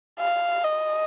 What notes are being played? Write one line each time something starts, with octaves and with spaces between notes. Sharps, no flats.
F5
D#5